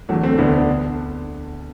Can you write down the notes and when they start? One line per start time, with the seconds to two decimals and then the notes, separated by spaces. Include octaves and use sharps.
0.09 E2 D3 F#3 A3
0.23 A3 C4
0.38 D2 D3 B3 D4
0.70 D3